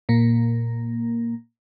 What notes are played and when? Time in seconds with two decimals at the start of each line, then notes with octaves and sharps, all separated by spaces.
0.09 A#2 A#3